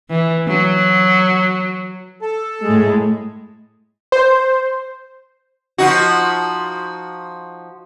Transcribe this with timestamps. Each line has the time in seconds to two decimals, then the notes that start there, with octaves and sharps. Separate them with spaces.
0.10 E3
0.48 F#3
2.22 A4 A5
2.65 A2 G#3
4.12 C5
5.78 F3 D#4 F#4